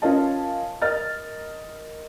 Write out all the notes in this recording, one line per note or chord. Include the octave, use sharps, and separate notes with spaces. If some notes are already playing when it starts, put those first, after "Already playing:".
C#4 F4 A#4 D#5 F5 A5
A#4 D#5 F6 A6